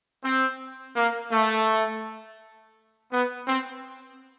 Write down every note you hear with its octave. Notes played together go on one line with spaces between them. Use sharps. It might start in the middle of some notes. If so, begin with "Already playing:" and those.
C4
A#3
A3
B3
C4